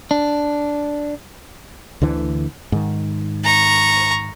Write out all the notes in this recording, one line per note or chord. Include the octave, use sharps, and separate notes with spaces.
D4
D2 D3 E3
G#2 D#3
A#5 C#6